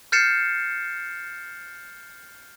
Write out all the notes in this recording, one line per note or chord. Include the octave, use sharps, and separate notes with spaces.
F6 G6 A6 C7 C#7 E7